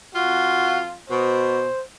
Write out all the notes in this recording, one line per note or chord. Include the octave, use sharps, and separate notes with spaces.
F2 F4 F#4
B2 C5